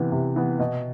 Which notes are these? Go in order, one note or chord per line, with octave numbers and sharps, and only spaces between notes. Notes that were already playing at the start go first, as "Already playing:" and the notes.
Already playing: C3 E3 B3
C3
E3 B3
B2